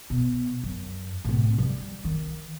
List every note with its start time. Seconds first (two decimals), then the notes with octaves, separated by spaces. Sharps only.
0.10 B2
0.63 F#2
1.24 A2 C3
1.58 F3 G3
2.04 D#3